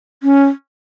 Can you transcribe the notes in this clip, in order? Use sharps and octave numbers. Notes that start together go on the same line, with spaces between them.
C#4